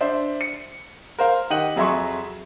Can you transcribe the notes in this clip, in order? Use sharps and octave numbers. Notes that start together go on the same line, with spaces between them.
D4 C5 E5
C#7
A#4 C5 F5
D#3 G4 D#5 F#5 D#7 F#7
F2 F#3 G#4 E5 C6 C#6